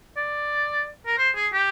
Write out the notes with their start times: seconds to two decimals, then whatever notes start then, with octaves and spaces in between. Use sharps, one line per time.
0.16 D5
1.06 A#4
1.18 C5
1.36 G#4
1.53 G4